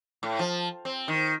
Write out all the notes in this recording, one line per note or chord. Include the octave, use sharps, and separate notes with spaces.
A2
F3
C4
D#3